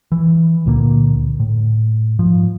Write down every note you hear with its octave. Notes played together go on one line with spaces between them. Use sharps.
E3
C#2 A#2 D3 A#3
A2
G#2 F3